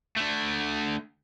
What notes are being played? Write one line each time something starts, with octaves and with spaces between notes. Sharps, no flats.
D3 A3